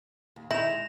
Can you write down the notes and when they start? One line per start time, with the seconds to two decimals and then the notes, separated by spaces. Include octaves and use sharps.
0.36 D#2
0.51 D#3 D#4 E4 E5 A#6 E7 F7
0.69 G#3